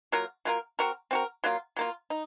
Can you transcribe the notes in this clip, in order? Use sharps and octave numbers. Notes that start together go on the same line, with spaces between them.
F#3 A#3 F4 A#4
F#3 A#3 F4 A#4
C4 F#4 A#4
C4 F#4 A#4
F#3 A#3 F4
F#3 A#3 F4
D#4